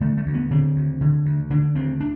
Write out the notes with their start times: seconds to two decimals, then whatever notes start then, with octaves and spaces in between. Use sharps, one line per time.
0.01 D3 A3
0.17 A3
0.26 D2
0.34 B3
0.51 D3 C4
0.76 D2
1.01 D3
1.25 D2
1.50 D3 D4
1.75 D2 C4
2.01 D4